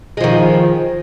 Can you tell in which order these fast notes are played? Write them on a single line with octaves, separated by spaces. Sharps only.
G#3 F3 D#3